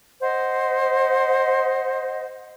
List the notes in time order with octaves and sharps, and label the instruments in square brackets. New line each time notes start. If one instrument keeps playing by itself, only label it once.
[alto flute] C5 [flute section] D#5 F#5